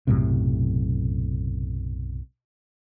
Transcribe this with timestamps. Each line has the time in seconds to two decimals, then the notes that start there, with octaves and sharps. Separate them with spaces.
0.07 B1 F#2 A2 C3